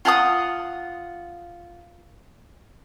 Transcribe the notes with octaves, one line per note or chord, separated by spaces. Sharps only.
F4 F#5 G#5 D#6